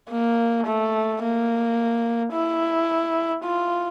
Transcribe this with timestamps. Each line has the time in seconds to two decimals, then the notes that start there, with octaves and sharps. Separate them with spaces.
0.11 A#3
0.67 A3
1.23 A#3
2.33 E4
3.45 F4